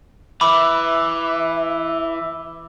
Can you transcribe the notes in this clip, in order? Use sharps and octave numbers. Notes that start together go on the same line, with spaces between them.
E3 E5 B5 D6